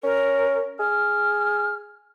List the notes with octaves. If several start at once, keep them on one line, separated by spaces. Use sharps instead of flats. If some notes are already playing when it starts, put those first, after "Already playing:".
C#4 A#4
G#4 F6